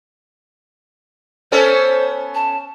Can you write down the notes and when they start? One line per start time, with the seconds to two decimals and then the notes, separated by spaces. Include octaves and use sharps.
1.52 B3 C#4 A4 C5
2.35 A5